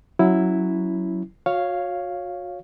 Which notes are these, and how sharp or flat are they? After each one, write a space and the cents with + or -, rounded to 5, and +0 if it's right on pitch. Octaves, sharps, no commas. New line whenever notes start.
F#3 +0 C#4 +0 E4 +0
F#4 -35 C#5 +0 F5 +0